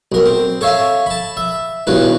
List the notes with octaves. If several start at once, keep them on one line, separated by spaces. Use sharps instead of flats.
B1 A#4
C4
A4 C#5 E5 F5
A5 B5
E5
B1 E2 G2 C#4 B4